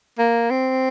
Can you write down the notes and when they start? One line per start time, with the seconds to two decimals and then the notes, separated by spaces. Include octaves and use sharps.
0.19 A#3
0.50 C4